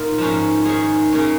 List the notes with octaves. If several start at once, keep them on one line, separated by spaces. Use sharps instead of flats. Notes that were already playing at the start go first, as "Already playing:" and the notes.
Already playing: A#2 D#4 F4 A#4
G#2 F3 A#3 C#4
D#3 C#4 G#4 C#5
C#3 A#3 C#4